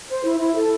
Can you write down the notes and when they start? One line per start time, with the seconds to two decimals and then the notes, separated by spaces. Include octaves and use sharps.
0.09 C5
0.25 E4
0.40 E4
0.55 A4